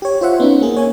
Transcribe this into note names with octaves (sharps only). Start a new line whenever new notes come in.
G4 C#5
F4 C5 E5 F#5
B3 C#4 D#4
A#3 G#4
A#3 C#5 G#5